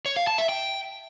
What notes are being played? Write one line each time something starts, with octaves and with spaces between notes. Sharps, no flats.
C#5
F5
A5
E5
G5